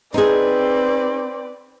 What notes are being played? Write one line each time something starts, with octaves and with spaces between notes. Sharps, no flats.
C4 D#4 G#4 B4 D5